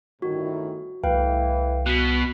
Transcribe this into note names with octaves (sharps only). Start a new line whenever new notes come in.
G1 A2 D#3 F#4
C2 A2 E3 B4 F5 G5
B2 F#4 F#6 B6